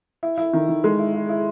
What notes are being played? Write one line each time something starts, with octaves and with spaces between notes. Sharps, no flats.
E4
E4
D#3
D#3
G#3
E4
E4
E4